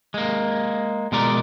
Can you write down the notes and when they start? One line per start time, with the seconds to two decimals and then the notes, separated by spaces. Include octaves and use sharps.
0.14 G#3 A#3
1.12 B2 G#3 A#4 D5 A#5